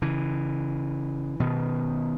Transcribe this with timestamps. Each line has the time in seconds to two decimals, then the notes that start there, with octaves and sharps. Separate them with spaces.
0.02 C#3 E3
1.40 B2 D#3